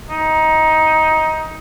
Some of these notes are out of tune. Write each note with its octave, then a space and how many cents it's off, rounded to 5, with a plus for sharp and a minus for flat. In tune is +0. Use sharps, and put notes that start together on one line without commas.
D#4 +15